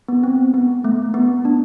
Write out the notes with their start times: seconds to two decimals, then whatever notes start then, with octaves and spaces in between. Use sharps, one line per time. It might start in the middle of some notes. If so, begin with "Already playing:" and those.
0.08 B3
0.23 C4
0.54 B3
0.84 A3
1.14 B3
1.45 D4